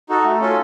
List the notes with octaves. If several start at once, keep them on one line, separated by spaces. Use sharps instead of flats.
D#4 F#4 A4
A3
C#4 F4 A4